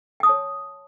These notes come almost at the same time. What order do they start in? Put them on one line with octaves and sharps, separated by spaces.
G5 D#6 A5 C#5